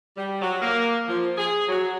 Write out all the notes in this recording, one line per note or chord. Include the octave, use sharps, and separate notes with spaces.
G3
F#3
A#3
F3
G#4
F#3